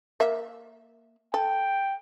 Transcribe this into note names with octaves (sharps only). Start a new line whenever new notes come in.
A#3 E5
A4 G5